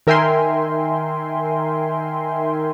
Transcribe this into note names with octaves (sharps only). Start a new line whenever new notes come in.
D#3 A#4 E5 G5 G#5 C6